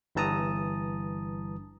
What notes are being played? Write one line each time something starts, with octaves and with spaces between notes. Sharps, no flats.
G1 G2 E3 A5 A#5 D#6